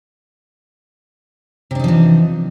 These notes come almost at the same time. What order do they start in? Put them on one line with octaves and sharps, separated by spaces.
C3 D4 D#4 F3 E3